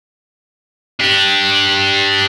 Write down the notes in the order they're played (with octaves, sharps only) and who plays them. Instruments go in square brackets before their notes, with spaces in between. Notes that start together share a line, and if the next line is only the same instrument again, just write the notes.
[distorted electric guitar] D4 G4